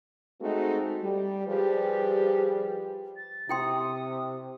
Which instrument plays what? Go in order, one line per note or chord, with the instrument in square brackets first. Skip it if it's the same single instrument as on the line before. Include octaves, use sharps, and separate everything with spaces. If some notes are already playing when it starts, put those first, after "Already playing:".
[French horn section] G#3 A3 C4 D#4 F#4
G3
F3 G3 G4 G#4 B4
[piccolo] A6
[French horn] C3 [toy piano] E4 G5 C6 [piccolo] D#6